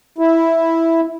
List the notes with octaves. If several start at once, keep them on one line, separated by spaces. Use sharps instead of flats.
E4